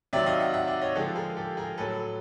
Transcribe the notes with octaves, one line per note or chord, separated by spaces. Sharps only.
C3 D#3 F#3 D5 E5
D#5 F5
E5 F#5
E5 F#5
D5 E5
C#5 D#5
D3 F3 G#3 G4 A4
G#4 A#4
G4 A4
G#4 A#4
A2 F#3 A4 B4